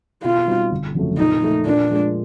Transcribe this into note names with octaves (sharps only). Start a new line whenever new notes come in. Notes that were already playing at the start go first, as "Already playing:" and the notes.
B2 F4
G3 C4 D#4 F#4
G1
F2 C#3 F#3 A3
A#2 D#4
F3 A3
A#2 D4
F3 G#3